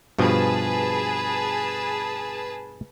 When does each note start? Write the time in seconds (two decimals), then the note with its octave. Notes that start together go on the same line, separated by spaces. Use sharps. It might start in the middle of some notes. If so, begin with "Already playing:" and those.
0.19 G2 B2 F3 G#4 B4 A5